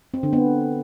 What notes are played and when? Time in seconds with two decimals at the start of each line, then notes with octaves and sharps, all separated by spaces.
0.14 C4
0.23 D3
0.33 B3